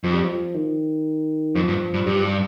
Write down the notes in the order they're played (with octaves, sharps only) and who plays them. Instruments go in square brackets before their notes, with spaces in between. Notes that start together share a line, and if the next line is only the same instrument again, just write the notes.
[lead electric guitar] F2 [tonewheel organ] F3
[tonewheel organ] G3
F3
D#3
[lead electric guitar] F2 [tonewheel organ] F3
[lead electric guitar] G2
G2
[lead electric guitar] G2 [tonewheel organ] G3